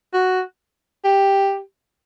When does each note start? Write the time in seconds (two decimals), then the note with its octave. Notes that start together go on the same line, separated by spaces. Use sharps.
0.14 F#4
1.05 G4